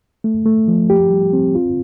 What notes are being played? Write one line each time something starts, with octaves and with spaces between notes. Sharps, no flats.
A3
A3
F3
G4
G3
C4
F4